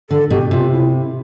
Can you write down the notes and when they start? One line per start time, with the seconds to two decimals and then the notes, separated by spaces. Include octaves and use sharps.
0.10 D3 A4
0.30 B2 G4
0.51 C3 F4
0.72 E4